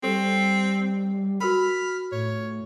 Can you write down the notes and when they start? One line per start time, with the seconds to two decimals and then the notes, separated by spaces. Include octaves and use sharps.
0.03 G3 C4 A4 C5 C#6
1.41 F#4 A#4 G5 B5 F6
2.12 A2 C#5